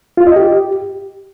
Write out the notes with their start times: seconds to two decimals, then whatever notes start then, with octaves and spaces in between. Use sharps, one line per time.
0.17 F4
0.27 D#5
0.36 G4